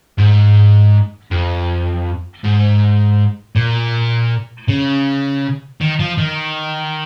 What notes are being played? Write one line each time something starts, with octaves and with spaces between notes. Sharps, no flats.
G#2
F2
G#2
A#2
C#3
D#3
F3
D#3